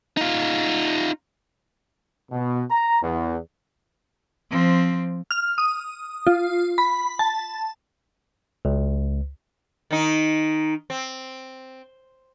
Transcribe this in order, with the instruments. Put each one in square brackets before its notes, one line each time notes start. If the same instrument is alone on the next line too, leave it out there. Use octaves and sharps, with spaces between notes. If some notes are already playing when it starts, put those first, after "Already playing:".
[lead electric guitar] D#4 F4
[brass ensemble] B2
A#5
E2
[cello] F3 C4
[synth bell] F6
D#6
F4
B5
A5
[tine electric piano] C#2
[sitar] D#3 D#4
C4